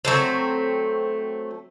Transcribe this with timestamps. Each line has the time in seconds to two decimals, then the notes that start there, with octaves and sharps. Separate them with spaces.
0.05 F#3 G3 A3 C4